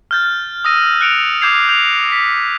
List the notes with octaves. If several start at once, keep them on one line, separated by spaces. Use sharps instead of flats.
F6 G6 A6
D#6 E6 A#6 D#7
F#6 C#7 D7 F7
D6 G6 G#6 C7 F7
G6 F7
B6